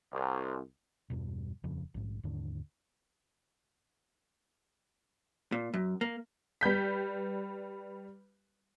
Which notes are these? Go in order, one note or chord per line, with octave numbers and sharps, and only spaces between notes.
C2
E2 G2 B2
D#1 F2 C#3 F3
A#1 G#2
D#2 G#2 D3 D4
A#2
F#2
A#3
G3 B4 G6 B6